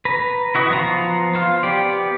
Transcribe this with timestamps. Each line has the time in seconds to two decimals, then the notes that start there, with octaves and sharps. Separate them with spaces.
0.05 B4 A#5
0.55 E4 F#4 D#5
0.70 F3 B3 F4 C5 A#5
1.35 F4 C5 F5
1.63 B3 G4 D5